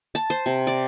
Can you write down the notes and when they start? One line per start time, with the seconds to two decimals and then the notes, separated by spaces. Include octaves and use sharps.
0.15 A5
0.30 C5
0.46 C3
0.67 D5